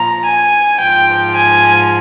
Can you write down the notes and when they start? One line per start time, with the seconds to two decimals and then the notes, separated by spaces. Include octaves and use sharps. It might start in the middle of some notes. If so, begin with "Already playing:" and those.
Already playing: A#2 F3 A#5
0.25 G#5
0.80 G#2 F3 G5
1.36 G#5